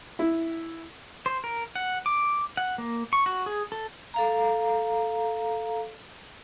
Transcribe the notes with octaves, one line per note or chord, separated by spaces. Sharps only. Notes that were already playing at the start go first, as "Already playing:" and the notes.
E4
C5
A#4
F#5
D6
F#5
A#3
C#6
F#4
G#4
A4
A4 F5 A#5